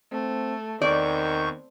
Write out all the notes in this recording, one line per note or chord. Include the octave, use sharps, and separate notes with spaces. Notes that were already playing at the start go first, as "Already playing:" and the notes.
A3 C4
E2 D#3 C4 D5 C#6 G6